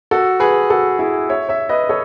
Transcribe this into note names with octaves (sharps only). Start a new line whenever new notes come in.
F#4 A4
G#4 B4
F#4 A4
E4 G#4
C#5 E5
C#5 E5
B4 D#5
A4 C#5